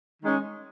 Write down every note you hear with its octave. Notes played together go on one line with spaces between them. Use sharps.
D#3 G#3 C#4